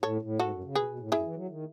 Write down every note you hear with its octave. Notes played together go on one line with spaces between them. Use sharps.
A2 A4 C#5
A2
G#2 F#4 A4
F#2
C#3
B2 G#4 B4
B2
A2
F#2 E4 G#4
E3
F#3
D#3